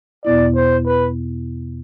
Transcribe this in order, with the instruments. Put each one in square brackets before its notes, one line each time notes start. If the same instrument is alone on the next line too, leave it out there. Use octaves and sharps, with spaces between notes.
[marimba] E2 B2 B3 E4 [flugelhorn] D5
[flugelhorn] C5
B4